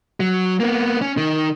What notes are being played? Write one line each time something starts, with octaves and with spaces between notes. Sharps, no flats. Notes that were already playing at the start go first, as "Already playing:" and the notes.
F#3
A#3 B3
C#4
D#3